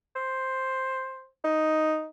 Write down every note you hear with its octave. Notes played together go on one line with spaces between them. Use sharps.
C5
D#4